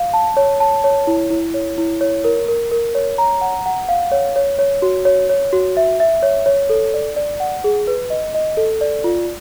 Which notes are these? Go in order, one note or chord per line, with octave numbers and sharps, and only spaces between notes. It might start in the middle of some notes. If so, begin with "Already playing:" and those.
Already playing: F5
A5
C#5
A5
C#5
E4
E4
C#5
E4
C#5
A#4
A#4
A#4
C#5
A#5
F#5
F#5
F5
C#5
C#5
C#5
F#4
C#5
C#5
F#4
E5
E5
C#5
C#5
A4
D5
D5
F#5
G#4
B4
D#5
D#5
A4
D5
F4